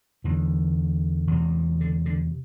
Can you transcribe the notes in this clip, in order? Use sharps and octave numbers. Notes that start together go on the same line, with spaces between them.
E2 D3 E3
E2 C3
D3
D3